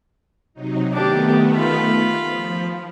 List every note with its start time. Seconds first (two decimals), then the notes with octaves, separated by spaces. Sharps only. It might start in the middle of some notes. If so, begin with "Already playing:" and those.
0.54 C3 F#3 D#4
0.93 D#3 A3 B3 D4 G4
1.54 F4 B5
2.20 F3